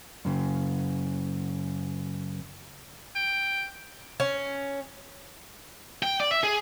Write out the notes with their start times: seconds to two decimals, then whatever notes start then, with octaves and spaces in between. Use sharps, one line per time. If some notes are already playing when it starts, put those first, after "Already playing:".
0.25 F#2 C#3
3.15 G5
4.20 C#4
6.03 G5
6.20 D5
6.31 E5
6.43 G#4